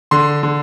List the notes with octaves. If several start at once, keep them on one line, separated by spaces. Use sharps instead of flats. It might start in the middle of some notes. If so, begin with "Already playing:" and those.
D3 C6
D3